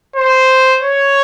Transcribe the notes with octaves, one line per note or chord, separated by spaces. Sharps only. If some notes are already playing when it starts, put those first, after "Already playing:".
C5
C#5